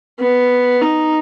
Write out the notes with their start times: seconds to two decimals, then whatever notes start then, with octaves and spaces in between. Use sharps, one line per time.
0.19 B3
0.81 D#4